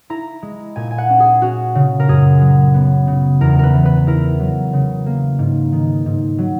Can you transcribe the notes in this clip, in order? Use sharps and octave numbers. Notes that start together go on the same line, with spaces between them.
E4 A#5
G#3
A#2 G#5
G#5
F#5
C#4
G#4
C#4 F#4
C#3
A#4
F#2 G#4
F#3
B3
C#3
E2 A#4
A#4 B4
E3
B4
E4 A#4
F#3
C#3
A#3
G#2
D#3
G#2
F#3